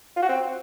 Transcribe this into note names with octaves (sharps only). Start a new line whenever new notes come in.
F4
F#4
C4